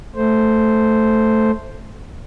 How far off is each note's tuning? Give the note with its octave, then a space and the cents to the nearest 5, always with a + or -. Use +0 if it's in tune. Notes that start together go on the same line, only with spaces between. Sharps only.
A3 +0 C5 +0